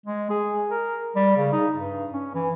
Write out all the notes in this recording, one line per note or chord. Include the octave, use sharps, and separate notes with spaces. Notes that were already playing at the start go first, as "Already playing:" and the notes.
G#3
G#4
A#4
G3
C#3
D#4
G2
C#4
E3